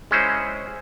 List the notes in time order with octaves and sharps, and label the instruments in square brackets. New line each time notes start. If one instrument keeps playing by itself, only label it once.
[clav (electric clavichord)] G#3 C#4 E4 C5